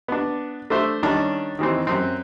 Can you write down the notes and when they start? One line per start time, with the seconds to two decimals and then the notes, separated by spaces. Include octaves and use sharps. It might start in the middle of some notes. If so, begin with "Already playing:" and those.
0.08 B3 D4
0.70 A3 D4 C5 E5
1.03 D#3 G3 C#4 D4 A5
1.59 D#3 E3 C4
1.87 F#2 C4